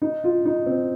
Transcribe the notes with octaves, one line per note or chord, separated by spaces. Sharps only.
D#4
F4
D#4
C4